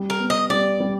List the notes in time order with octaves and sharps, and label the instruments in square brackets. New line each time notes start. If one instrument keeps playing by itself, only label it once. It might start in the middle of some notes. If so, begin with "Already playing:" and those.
Already playing: [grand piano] G3
[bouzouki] A#4
[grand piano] B3
[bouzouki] D#5
[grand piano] G3 [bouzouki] D5
[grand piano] G3